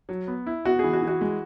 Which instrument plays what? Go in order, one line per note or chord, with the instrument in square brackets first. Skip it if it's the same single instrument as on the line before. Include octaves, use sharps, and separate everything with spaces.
[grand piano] F#3
B3
E4
[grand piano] B3 [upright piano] F#4
[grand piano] E3 [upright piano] G#4
[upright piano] F#4
[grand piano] E3
[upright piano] F#4
[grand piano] G#3